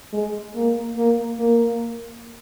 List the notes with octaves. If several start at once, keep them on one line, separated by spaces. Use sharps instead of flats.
G#3
A#3
A#3
A#3